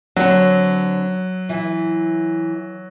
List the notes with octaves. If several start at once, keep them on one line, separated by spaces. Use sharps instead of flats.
D3 F#3 C4 C#5
E3